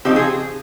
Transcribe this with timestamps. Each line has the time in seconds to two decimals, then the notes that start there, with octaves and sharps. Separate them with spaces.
0.05 C#3 F3 C4 D#4 G4
0.16 G#4